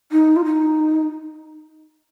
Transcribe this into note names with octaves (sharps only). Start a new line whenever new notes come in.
D#4
F4
D#4